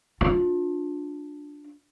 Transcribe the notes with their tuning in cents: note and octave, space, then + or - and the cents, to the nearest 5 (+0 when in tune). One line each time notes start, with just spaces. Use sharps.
D4 +0 F4 +35